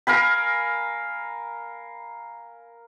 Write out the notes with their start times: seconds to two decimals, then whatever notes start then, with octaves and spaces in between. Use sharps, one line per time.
0.07 A#4 F5 G#5 B5